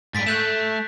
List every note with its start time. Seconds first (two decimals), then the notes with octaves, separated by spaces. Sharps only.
0.15 G#2 G3 A6 B6 D7
0.27 A3 F#6 G6 E7